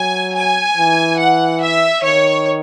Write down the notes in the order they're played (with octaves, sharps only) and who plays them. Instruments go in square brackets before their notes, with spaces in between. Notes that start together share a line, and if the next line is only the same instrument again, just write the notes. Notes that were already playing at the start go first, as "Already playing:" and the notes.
Already playing: [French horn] F#3 [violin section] G#5
[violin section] G#5
[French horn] E3
[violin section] F#5
E5
[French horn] D#3 [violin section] C#5